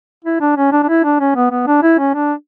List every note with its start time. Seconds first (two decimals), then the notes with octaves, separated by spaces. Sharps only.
0.25 E4
0.41 D4
0.57 C#4
0.72 D4
0.83 D4
0.89 E4
1.04 D4
1.20 C#4
1.36 B3
1.51 B3
1.67 D4
1.83 E4
1.99 C#4
2.14 D4